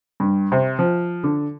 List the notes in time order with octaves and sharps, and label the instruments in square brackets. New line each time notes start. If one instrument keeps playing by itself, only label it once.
[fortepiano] G2
C3
F3
D3